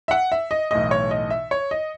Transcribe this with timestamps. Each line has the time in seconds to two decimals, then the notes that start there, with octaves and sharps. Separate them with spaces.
0.08 E5
0.11 F#5
0.32 E5
0.51 D#5
0.71 B1 A2 E3 D#5
0.91 C#5
1.11 D#5
1.30 E5
1.51 C#5
1.71 D#5